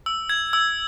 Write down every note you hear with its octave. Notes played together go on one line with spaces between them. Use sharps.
E6
G#6
E6